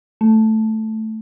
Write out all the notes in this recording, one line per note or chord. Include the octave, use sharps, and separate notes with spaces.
A3